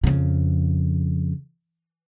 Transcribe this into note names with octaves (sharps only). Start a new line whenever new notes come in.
F2 C#3